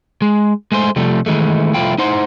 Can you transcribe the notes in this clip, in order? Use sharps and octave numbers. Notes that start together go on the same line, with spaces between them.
G#3
G#3 A3 G#4 C5
C3 F3 G3 A3
D#3 E3 G#3 A3
C2 F3 A3 E4 F4 G5
D#4 E4 C5 F#5 C6